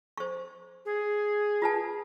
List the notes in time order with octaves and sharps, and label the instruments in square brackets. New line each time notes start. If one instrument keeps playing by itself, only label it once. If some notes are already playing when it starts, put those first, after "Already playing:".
[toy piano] C5 C#6
[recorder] G#4
[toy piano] F4 B4 A5